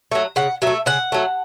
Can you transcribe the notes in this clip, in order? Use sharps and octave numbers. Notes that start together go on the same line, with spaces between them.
F#3 A3
C#3 F#5
F#3 A3 E5
C#3 F#5
F#3 A3